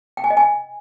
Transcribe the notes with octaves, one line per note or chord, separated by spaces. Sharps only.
G5
G#5
D#5
G#5